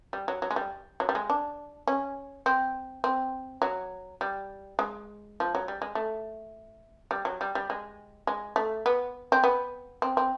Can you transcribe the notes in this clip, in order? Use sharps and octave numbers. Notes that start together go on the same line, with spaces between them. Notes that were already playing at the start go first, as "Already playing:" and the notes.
G3
F#3
F#3
G#3
G3
F#3
G3
G#3
D4
C#4
C4
C4
F#3
G3
G#3
F3
F#3
G3
G#3
A3
G3
F#3
G3
G3
G#3
G#3
A3
B3
C4
B3
C4
C4